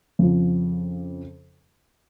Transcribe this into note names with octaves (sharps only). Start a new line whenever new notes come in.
F2 C#3 F3